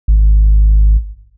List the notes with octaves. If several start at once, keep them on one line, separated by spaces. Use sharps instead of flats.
G#1